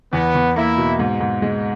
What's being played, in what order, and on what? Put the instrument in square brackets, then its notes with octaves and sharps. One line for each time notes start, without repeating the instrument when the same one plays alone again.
[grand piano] E2 [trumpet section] B3
[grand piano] E2
[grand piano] A#3 [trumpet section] E4
[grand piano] B2
G#2
G#2
G#3